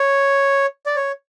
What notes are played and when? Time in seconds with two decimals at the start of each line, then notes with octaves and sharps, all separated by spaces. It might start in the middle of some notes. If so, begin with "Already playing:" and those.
Already playing: C#5
0.86 D5
0.96 C#5